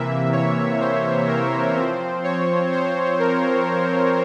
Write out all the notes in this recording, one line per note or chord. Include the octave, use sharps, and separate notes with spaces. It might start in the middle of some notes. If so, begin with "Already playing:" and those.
Already playing: C3 E3 A#3 E5
C#5
C5
A#4
F3 C4 C5
C#5
C5
A#4